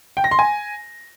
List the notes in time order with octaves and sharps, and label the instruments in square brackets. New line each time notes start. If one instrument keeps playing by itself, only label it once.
[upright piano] G5
A#6
C6
G#5